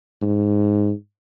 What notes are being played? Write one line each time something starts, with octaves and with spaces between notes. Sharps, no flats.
G#2